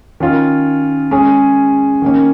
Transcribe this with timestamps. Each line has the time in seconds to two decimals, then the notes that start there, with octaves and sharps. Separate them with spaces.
0.20 D#3 C#4 F4 A#4
1.11 G#3 C#4 G#4
2.02 D#3 A#3 C#4